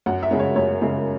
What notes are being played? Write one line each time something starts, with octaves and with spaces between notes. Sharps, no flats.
F#2 F#5
E5
C#3 G#3 C#4
C#5
F#2 C#5
C#3 G#3 C#4